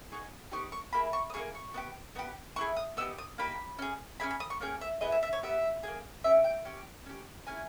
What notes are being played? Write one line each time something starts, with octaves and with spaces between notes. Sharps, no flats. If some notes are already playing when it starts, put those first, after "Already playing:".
B3 D#4 G#4 C#6
B3 D#4 G4 C#6
C#6
A#3 E4 G#4 B5
C#6
D#6
A#3 E4 G#4 C#6
C#6
B3 D#4 G4
B3 D#4 G4
B3 E4 G#4 C#6
D#6
B3 D#4 G4 E6
D#6
A#3 D#4 G4 B5
C#4 G#4
C#4 E4 G#4 B5
B5
D#6
C#6
A#3 C#4 G#4 G5
E5
B3 E4 G#4 D#5
E5
E5
C#5
B3 G4 E5
A#3 C#4 G#4
C#4 G4 E5
G5
C#4 G4
C#4 G4
C#4 E4 G#4 G#5